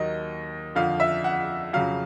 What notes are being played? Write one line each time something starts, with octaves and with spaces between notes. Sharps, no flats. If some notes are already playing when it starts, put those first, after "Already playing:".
Already playing: D#2 D#3 F#3 D#5
F2 D3 F3 F5
E5
F#5
F2 C#3 F#3 F5